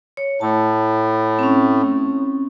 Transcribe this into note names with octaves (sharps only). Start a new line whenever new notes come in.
C#5
A2 A5
C4 C#4